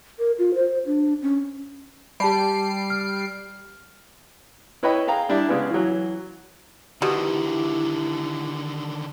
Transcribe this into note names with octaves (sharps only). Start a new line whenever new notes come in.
A#4
F4
C5
D4
C#4
G3 G4 A5 B5 C7 D7
F6
E4 B4 C#5 D#5 G5 B5
G#4 F5 G5 A#5
G3 D4 E4 E5
C#3 G#3 B3 G#4
E3 F#3
B2 D3 D#3 E4 G4